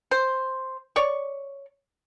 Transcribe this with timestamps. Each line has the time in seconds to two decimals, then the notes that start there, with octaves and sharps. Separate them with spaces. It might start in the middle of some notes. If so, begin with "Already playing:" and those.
0.11 C5
0.96 C#5 D5 C#6